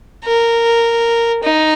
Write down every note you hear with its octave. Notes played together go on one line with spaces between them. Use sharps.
A#4
D#4